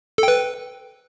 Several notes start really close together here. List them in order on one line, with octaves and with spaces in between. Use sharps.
A4 G5 B4